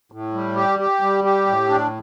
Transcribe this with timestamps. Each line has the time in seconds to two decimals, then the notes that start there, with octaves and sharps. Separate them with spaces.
0.12 A2
0.34 G3
0.56 G4
0.79 G4
1.01 G3
1.24 G4
1.47 A2
1.69 D4